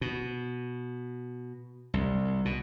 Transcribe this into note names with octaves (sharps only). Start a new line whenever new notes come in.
B2
C2
B2